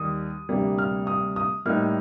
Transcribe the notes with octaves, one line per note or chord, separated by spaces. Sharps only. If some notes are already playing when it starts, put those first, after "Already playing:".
Already playing: D#2 D#3 G3 D#6
D2 C3 G3 A#3
F6
D#6
D#6
A2 G3 A#3 D#4 F6